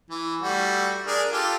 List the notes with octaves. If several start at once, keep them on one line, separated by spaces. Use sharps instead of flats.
E3
G3 A3 F#4
D4 G#4 A#4
F4 G4 A4